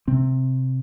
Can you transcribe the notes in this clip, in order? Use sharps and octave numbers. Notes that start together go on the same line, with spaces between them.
C3 C4